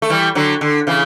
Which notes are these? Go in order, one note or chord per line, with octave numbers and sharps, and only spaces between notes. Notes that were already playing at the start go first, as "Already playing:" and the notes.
A3
E3 G3
D3 F#3
D3
C#3 E3